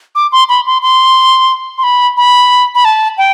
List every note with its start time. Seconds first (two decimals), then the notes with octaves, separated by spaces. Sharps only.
0.15 D6
0.32 C6
0.49 B5
0.66 C6
0.82 C6
1.78 C6
1.83 B5
2.17 B5
2.75 B5
2.85 A5
3.18 G5